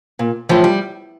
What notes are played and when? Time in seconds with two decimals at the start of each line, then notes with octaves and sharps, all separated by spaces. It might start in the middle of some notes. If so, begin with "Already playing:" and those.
0.19 A#2
0.49 A2 E3 F3
0.64 G3